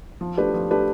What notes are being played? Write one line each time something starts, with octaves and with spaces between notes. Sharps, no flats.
F3
A3 D4 G4 B4
F3
A3 D4 G4 B4